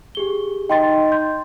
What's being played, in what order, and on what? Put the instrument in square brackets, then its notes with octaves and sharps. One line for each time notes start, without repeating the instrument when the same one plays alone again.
[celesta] G4 G#4 G7
[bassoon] D#4 [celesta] G5 C6 A6
[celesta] C6 G6